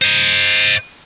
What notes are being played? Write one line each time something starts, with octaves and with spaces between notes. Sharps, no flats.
C5 D#5